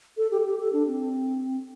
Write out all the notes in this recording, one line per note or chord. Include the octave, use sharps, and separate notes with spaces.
A4
G4
A4
G4
A4
D4
C4